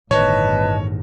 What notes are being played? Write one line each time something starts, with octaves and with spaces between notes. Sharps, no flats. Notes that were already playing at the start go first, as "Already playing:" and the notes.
G1 E2 A2 D#3 B4 C#5 D#5 A5